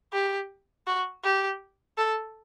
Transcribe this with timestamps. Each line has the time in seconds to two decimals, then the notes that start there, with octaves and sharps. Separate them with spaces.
0.13 G4
0.87 F#4
1.24 G4
1.98 A4